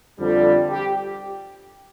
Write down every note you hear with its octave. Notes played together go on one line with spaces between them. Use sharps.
F2 D3 G3
G4